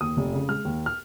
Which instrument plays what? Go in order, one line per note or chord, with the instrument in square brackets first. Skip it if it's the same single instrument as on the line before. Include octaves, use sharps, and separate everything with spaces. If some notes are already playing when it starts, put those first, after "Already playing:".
[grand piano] D#2 D#6
F1
C#3
G#3 F6
D#2
F6